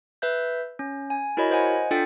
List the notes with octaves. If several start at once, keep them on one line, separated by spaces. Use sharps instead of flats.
B4 E5 G6
C#4
G#5
E4 F#4 A#4 C#5 D#5 B5
C5 D#5 F#5 G#5
D4 F4 A4 G5 A6 C#7